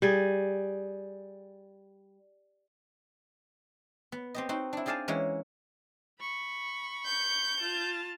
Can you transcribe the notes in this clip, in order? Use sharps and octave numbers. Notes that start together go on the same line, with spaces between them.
G3 G#4
B3
C4 G4 D#5
C4 D#4 F#4
D4 E4
G4 G#4 D5 F5 G#5 A5
E3 G#3 A#3 C#4
B5 C#6
G6
F4 A5